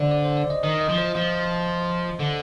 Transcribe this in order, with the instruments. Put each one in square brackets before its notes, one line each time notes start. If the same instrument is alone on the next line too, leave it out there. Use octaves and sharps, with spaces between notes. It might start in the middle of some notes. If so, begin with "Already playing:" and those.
Already playing: [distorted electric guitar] D3 [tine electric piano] C5 D5
[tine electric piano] D5
C5
D5
D#5
[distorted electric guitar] D#3 [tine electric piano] D#5
[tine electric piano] D#5
[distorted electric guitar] F3
[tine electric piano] C5
[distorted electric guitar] F3 [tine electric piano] C5
[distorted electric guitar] D3